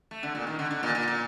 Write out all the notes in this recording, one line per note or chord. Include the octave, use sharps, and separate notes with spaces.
A3
D3
A#2
D#3
D3
D3
A#2
A#2
A#2